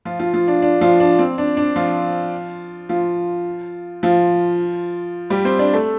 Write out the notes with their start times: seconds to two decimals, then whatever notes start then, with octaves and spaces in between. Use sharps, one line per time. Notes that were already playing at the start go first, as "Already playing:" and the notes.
0.05 F3 F4
0.19 F3 F4
0.34 F3 F4
0.47 D4
0.62 D4
0.81 F3 F4
1.00 D4
1.19 C4
1.38 D4
1.57 D4
1.76 F3 F4
2.89 F3 F4
4.03 F3 F4
5.30 G3 G4
5.45 C4 C5
5.59 D4 D5
5.73 A3 A4